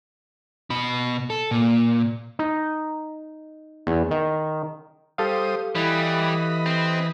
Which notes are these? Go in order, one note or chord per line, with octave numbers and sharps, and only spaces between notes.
B2 B5
A4
A#2
D#4
E2
D#3
G3 G4 A4 C5 F5 D#6
E3 G3 D#5 B5
C4